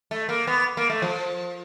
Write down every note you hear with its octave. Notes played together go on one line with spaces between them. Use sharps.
A3
A#3
B3
A#3
A3
F3